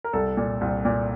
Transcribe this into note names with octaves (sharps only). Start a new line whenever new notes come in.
A#4
C2 A4
A#2
C2
A#2